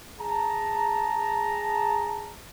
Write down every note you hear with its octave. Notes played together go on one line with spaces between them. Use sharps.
G#4 A5 A#5